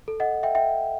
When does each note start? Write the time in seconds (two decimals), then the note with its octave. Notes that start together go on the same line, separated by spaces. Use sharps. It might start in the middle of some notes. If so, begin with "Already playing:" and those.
0.08 A4
0.20 D#5 F#5
0.43 E5 G5
0.55 E5 G5